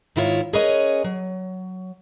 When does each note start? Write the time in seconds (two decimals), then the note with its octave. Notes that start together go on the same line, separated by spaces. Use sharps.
0.16 G#2 D#3 E4 F4 A#4 C#5
0.53 C#4 G#4 A#4 B4 C#5 D#5
1.04 F#3